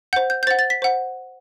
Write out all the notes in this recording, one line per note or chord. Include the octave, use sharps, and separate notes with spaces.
C5 F#5 G6
G6
G6
C5 F#5 A6
A6
B6
C5 F#5